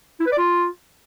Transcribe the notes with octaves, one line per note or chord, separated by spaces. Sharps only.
E4
B4
D5
F4